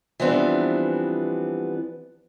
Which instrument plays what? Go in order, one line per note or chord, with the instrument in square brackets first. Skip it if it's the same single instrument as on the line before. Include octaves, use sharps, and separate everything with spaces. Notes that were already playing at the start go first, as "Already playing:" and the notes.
[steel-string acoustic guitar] E3 F3 G3 B3 C4 D4